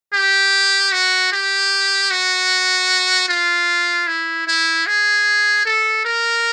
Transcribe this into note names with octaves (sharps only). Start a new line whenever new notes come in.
G4
F#4
G4
F#4
F4
E4
E4
G#4
A4
A#4